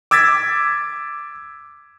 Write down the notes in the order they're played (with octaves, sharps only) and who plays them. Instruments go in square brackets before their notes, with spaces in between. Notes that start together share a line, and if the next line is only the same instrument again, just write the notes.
[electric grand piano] D6 E6 G#6 A6 B6